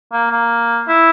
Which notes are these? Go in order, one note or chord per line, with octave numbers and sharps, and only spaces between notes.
A#3
A#3
E4